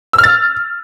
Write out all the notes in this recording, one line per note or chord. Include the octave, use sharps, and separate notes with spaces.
E6
F6
A6